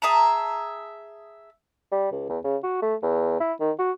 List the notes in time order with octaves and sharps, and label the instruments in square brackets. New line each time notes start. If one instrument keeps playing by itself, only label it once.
[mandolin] G#4 E5 A5 A#5
[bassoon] G3
C#2
E2
C#3
F#4
A3
E2
E4
D#3
F#4